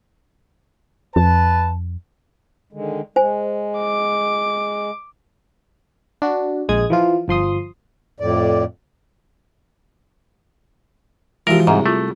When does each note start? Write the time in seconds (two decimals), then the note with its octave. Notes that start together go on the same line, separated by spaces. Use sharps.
1.16 F2 B4 A5
2.73 D3 D#3 G#3
3.16 G#3 C5 G#5
3.79 D6
6.22 D4 F#4
6.69 A#1 G#3 D#6 G#6
6.90 E3 F3 F4
7.28 G1 F3 C6 D#6
8.20 F2 A2 D5
11.47 E3 F3 G#3 F#4 G4 A#4
11.67 C2 G#2 G#4 E5 A#5
11.86 A3 F4